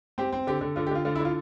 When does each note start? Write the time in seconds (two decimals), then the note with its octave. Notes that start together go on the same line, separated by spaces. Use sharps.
0.18 C4 G4
0.32 C4
0.47 D3 G4
0.61 D3
0.76 D3 F4
0.87 G4
0.91 D3 F4
1.05 D3 F4
1.16 E4
1.20 D3 F4